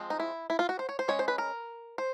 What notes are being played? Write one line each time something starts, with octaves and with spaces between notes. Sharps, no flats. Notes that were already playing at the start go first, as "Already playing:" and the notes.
Already playing: F3 G#3 C4
D#4
E4
E4
F4
F#4
C5
C#5
C5
G#3 C#4 C#5
C5
B4
A#4
C5